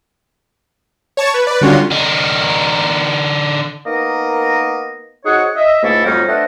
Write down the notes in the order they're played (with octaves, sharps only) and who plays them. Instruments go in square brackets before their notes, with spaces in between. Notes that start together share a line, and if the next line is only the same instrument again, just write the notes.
[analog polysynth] C#5 A5 C#6
B4
B4 D5
D3 G3 C#4 F4 F#4
[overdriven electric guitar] D3 D#4
[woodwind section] A#3 B3 D#4 A#4 D#5
D#4 F#4 G#4 C5 C#5 F#5
D#5 E5
C#2 G#2 A3 A#3 E4 A4
F2 F#3 G3 A3 C#4 D#4
A3 D4 B4 C5 D#5 F#5